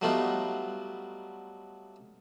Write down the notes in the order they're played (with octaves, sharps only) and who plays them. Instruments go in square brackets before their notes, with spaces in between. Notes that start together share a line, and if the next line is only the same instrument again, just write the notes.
[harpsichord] F#3 G3 A3 B3 D#4 F4